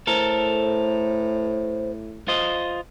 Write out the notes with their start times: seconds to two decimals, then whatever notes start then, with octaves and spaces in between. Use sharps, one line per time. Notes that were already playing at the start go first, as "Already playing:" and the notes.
0.07 A2 A4 A#4 C5
2.28 F4 C5 D#5